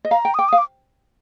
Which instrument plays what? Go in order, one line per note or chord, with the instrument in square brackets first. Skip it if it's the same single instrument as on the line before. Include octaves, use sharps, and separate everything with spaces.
[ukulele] D#5
[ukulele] F5 [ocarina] A#5
[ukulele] G5
[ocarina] D#6
[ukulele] G5 [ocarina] D6
[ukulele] F5 [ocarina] D#6
[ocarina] D6